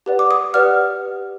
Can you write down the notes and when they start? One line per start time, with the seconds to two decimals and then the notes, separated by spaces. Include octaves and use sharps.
0.06 G4 B4 D5 F#5
0.19 D6
0.31 D#6
0.54 G4 B4 D5 F#5 F6